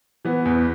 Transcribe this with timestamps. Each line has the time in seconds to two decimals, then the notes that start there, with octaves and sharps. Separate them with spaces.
0.25 E3 B3
0.45 E2